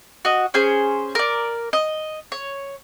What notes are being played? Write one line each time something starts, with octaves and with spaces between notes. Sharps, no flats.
F#4 D#5
C#4 G#4 C5
A#4 D5
D#5
C#5